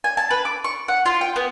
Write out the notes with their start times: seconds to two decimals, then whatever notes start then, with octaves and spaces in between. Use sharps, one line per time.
0.04 G#5
0.17 A5
0.31 B4
0.45 D6
0.64 C#6
0.88 F#5
1.06 F4
1.21 G5
1.36 B3